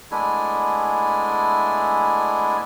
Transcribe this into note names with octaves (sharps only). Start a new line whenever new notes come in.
G#3 A3 B3 D4 E4 G#5